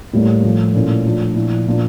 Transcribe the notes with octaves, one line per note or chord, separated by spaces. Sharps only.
A2 G3 A#3
A2 F3 A3
A#2 A3 C#4 E4
F3 A3 D4 F4
A#2 F3 A#3 E4
A#2 F3 A#3 D4 F4